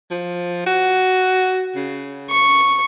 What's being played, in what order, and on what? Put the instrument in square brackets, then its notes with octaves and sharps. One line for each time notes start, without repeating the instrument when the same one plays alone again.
[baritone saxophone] F3
F#4
C#3
[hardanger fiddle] C#6